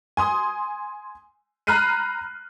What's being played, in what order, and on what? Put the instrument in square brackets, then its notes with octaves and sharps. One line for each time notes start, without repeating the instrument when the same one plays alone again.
[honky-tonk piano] G#5 C6 D#6
A#5 B5 F6 F#6 C7 D#7